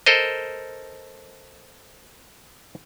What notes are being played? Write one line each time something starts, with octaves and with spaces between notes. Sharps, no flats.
A4 A#4 C5 D#5